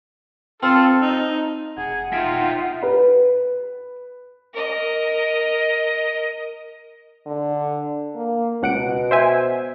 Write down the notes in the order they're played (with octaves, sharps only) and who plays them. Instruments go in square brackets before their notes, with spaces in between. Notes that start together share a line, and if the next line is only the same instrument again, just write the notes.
[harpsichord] C4 [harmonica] F4 A4
[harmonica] D#4
[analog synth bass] F1 [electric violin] G#4 G#6 [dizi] F#5
[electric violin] D#4 F4 [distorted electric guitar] E5 G5
[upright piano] B4
[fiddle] A#4 D#5
[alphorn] D3
A#3
[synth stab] C#2 F#5 D7 [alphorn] B2
[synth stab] C5 E5 G#5